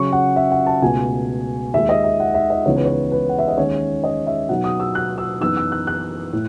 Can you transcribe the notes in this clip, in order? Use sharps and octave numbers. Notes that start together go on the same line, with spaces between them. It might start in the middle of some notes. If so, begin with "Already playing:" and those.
Already playing: C#3 F#3 C#4 C#6
F#5
E5
F#5
A5
C#2 B2 A3 G#5
D#2 D#3 G#3 E5
D#5
E5
F#5
E5
D#5
C#2 C#3 E3 B3 D#4 C#5
B4
C#5
B4
F#5
E5
D#5
D#2 D#3 G#3 C#4 C#5
D#5
E5
B2 F#3 B3 D#4 F#5
D#6
E6
F#6
E6
F#2 E3 B3 D#4 E6
E6
F#6
F#6
A2